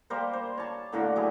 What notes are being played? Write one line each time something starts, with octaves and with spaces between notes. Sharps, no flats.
G3 A#3 A#4 C5
C5
C#5 A5
A2 D3 A#3 F#4
F#3 G3 G#4 B4